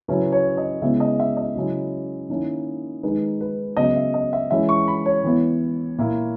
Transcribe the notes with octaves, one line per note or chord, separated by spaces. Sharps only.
C#3 F#3 C#4 E4 B4
C#5
D#5
C#3 G#3 B3 E4 E5
D#5
E5
D#5
C#3 F#3 C#4 E4
D#3 A#3 C#4 E4
D#3 G#3 D#4 B4
B4
C#3 F#3 B3 D#5
E5
D#5
E5
E3 G#3 C#4 E4 E5
C#6
B5
C#5
E3 B3 E4
A#2 A#3 E4